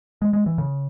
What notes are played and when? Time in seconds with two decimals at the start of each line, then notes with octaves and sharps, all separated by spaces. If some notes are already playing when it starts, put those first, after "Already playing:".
0.22 G#3
0.33 G#3
0.46 E3
0.58 C#3